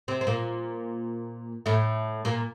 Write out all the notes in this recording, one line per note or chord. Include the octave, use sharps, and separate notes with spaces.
C3 C4
C4
A#2 A#3
A2 A3
A#2 A#3